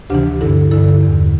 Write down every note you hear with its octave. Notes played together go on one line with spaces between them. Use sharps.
D2 C3 E3 D4 G4
G2 D3 E4 A4
G2 D3 E4 A4
E2 D3